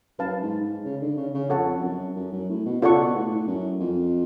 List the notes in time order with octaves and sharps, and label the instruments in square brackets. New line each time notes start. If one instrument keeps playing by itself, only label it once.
[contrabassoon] F#2 [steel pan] B4 F5 A5
[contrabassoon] G#2
G#2
C#3
D3
C#3
C#3
[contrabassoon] F2 [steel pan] A4 C#5 F#5 A5
[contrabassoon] F2
F#2
F#2
F#2
A2
B2
[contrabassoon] C#3 [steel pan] F4 A4 D5 F#5 C#6
[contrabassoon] B2
A2
A2
F#2
F2